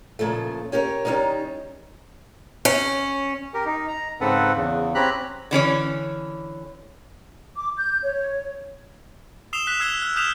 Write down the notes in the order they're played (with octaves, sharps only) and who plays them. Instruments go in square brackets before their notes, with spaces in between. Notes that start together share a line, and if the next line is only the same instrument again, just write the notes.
[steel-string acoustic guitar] A#2 C#3 F3 A3
C#4 G4 A#4 C#5
D#3 F#3 G3 C#4 D#4
C#4
[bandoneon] G4 A#4
D#4
A#5
G#2 C#3 C4 A4 B4 F#5
E2 C#3
C4 C#4 G4 A#5 B5 F#6
[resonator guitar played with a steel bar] D3 E3 C#4 C#5
[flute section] D6
G6
C#5
[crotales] D#6 E6 C7 E7 F7 G7
F#6 B6 F7
E6 G#6 C7 G7
F6
D#6 F6 G6 B6 E7 F7